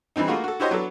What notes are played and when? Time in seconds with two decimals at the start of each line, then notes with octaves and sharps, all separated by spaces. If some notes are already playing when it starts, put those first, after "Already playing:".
0.16 E3 G3 C4 D#4
0.27 A3 A#3 F4 F#4 G#4
0.44 F#4 A4
0.60 E4 F#4 G4 C5 C#5 D#5
0.71 F#3 B3 D4 F#4 A4